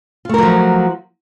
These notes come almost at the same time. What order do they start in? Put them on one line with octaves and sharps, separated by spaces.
F4 A3 A#4 F#3 F3